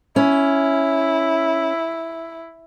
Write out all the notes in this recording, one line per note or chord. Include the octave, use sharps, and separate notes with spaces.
C#4 E4